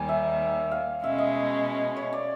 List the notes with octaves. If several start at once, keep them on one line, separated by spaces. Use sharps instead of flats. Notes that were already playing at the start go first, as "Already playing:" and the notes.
Already playing: D#2 D#3 G3 G#5
E5
F5
B2 G#3 C#4 E5
D#5
C#5
D5